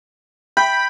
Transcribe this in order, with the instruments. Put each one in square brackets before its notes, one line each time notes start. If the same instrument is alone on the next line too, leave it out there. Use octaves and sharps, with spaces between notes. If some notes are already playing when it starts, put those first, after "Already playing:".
[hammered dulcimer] G5 [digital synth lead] B5